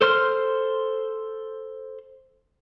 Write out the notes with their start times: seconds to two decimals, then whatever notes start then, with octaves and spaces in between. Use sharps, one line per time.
0.01 A4 C5 C6 F6